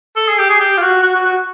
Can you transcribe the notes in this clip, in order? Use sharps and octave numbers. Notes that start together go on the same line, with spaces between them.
A4
G#4
G4
G#4
G4
F4
F#4
F#4
F#4
F#4